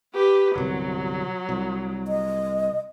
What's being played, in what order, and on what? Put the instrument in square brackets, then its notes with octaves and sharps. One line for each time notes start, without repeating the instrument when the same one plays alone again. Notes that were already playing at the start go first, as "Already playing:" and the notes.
[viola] G4 B4
[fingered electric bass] G1 C2 C3 [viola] F#3
[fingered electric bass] C2
[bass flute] D#5